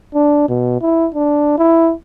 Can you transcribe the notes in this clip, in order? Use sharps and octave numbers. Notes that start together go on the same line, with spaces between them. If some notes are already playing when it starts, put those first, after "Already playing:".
D4
B2
E4
D4
E4